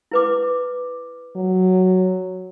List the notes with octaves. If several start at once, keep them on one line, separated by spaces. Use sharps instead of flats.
E4 B4 D6
F#3